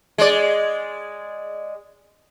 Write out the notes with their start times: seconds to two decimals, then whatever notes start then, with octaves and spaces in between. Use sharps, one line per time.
0.18 G#3 D5